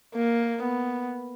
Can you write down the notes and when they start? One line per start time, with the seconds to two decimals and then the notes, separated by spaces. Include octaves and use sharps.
0.16 A#3
0.63 B3